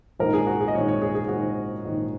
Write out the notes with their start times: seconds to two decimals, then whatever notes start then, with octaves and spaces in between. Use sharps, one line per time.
0.19 A#1 G#2 D#3 A#4
0.34 G#4
0.47 F#4
0.61 G#4
0.68 D#5
0.75 A#1 G#2 D#3 C#5
0.88 C#5
1.02 G#4
1.15 G#4
1.28 A#1 G#2 D#3 F#4
1.84 A#1 G#2 D#3